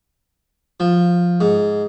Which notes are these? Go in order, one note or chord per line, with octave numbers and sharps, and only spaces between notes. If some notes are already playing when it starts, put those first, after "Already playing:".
F3
G#2